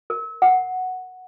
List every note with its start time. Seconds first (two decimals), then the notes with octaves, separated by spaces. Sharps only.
0.10 A#4
0.42 F#5